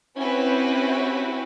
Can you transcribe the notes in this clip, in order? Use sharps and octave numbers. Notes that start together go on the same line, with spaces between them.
C4 C#4 E4 F#4 G4 B4